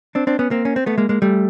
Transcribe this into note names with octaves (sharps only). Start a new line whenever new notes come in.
C4 D4
C4 D4
B3 C#4
A#3 C4
C#4
C4
A3 B3
G#3 A#3
G#3 A#3
G3 A3